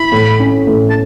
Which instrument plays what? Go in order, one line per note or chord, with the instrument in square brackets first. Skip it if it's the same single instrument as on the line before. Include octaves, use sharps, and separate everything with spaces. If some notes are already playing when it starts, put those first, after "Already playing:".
Already playing: [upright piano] E4 [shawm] B5
[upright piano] A2
C#4
A2
[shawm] A5